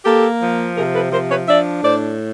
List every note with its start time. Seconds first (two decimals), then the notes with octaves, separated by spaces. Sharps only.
0.05 A#3 G4 A4
0.41 F3
0.76 C3 G#4 A#4
0.94 A4 B4
1.12 F3 A#4 C5
1.30 B4 C#5
1.47 D4 D5 E5
1.83 A2 C5 D5